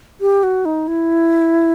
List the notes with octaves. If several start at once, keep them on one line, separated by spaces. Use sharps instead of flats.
G4
F#4
D#4
E4